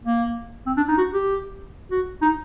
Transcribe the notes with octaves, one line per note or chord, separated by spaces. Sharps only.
A#3
C4
D4
D#4
F#4
G4
F#4
D#4